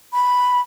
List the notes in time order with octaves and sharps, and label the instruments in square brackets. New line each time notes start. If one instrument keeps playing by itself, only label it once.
[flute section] B5